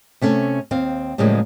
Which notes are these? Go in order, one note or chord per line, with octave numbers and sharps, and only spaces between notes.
C3 A3 C#4 A4
D#2 C4 F5
A2 C#3 F3 G3 G#3 A#3